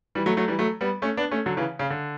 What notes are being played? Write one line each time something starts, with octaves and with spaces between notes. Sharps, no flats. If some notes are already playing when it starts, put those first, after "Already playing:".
E3 G3
F#3 A3
F#3 A3
E3 G3
F#3 A3
G3 B3
A3 C#4
B3 D4
A3 C#4
D3 F#3
C#3 E3
C#3
D3